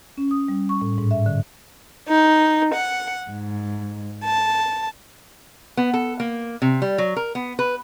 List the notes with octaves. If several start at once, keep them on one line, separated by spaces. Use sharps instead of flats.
C#4
D#6
G3
C#6
A2
G#2
E5
D3
D#4
F#5
G#2
A5
B3
A4
A#3
C3
G3
F#3
A#4
B3
B4